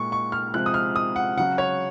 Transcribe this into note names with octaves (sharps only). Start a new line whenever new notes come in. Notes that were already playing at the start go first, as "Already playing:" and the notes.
Already playing: A#2 G#3 C#6
C#6
F6
C3 F3 G#3 F#6
D#6
F6
D#6
F#5
C#3 F#3 F#5
C#5